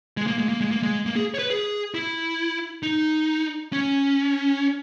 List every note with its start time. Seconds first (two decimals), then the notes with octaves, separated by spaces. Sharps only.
0.17 G#3
0.27 A#3
0.38 G#3
0.49 A#3
0.61 G#3
0.71 A#3
0.83 G#3
1.06 A#3
1.16 G#4
1.34 C#5
1.39 B4
1.50 G#4
1.94 E4
2.83 D#4
3.72 C#4